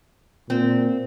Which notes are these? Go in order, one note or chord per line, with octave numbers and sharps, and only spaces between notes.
A#2 C4